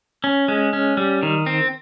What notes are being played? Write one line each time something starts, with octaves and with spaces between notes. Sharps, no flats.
C#4
G#3
C#4
G3
D#3
C4